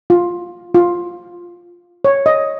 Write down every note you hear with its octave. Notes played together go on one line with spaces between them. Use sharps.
F4
F4
C#5
D#5